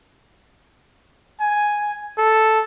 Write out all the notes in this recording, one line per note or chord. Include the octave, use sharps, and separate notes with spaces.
G#5
A4